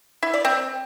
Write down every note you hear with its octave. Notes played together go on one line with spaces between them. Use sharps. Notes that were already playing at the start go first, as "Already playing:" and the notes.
E4
D5
C4